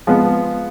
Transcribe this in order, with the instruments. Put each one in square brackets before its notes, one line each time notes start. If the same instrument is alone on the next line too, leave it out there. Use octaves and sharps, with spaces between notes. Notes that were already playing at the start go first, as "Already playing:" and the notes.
[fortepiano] F3 G#3 B3